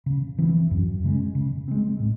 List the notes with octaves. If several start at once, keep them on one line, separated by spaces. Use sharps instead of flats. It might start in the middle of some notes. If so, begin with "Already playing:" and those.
C#3
E3 C4
F#2
C#3 G#3 C#4
C#3
G#3 C4
A2